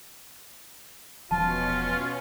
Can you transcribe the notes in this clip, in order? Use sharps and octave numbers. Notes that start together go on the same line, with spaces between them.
E1 B2 F3 C#4 F4 A5